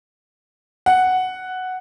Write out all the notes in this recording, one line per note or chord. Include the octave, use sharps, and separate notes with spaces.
F#5